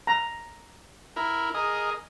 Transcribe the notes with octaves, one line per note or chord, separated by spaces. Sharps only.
A#5
E4 A#4
G#4 A#4 D#5